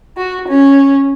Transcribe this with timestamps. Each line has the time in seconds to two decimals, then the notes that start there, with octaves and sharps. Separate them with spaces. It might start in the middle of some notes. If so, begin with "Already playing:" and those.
0.16 F#4
0.48 C#4